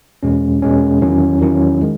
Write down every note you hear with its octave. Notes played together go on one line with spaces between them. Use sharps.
E2 B2 G#3 C#4
E2 B2 G#3 C#4
E2 D#3 F#3 C#4 E4
E2 D#3 F#3 C#4 E4
D#3 G#3